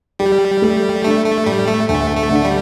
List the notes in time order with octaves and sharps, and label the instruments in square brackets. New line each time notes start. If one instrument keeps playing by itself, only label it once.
[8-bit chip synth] G3 [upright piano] G4
[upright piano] A3
[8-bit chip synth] A3 [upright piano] D4
[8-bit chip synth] A3
[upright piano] A2 [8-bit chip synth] G3
[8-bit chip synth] A3
[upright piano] D2 [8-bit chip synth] A3
[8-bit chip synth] A3
[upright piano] D3
[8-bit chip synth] G3